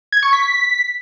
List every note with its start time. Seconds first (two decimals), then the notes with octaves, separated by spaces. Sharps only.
0.12 G#6
0.23 C#6
0.33 B6